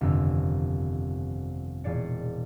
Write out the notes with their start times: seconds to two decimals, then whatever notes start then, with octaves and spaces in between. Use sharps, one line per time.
0.01 G1 F2 C3 D#3 A#5 E6
1.84 E1 A#2 G#4 D5 C7 C#7